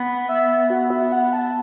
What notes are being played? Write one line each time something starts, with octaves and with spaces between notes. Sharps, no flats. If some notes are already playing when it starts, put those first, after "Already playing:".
Already playing: B3
E5
F#4
E5
F#5
A5